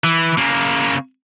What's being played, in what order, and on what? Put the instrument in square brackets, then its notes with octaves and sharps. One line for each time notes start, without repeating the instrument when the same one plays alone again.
[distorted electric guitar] E3
C#3 A#3